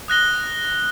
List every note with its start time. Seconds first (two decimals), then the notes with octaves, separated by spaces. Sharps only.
0.08 D#6 F#6 A#6 G7